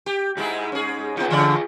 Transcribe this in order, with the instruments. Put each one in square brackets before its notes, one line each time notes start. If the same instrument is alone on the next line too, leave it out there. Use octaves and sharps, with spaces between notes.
[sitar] G4
[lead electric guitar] C2 G#2 [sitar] G#3 E4 G#4
[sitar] C#4 G#4
[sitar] B3 D#4 [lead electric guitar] F4 G#4
[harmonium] D3 [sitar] E3 D5